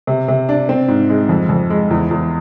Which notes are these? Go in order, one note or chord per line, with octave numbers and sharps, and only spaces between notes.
C3
C3
D4
C4
G#2
G#3
F2
F2
G#3
E2
E2